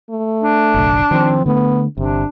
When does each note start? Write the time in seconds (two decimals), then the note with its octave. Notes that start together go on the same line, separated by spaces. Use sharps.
0.11 A3
0.42 D4
0.74 F#1 B1
1.11 D#3 F3 C4
1.46 D3 A3 B3
1.97 G1 C3 D4